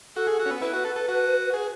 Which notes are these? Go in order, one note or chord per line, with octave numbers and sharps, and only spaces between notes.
F#4 A4
G#4
F#4
C#4
B3
E4 B4
F#4
A4
A4
F#4
G#4